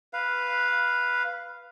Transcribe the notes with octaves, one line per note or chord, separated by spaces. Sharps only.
B4 F5